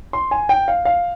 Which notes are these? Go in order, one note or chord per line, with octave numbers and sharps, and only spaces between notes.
C6
G#5
G5
F5
F5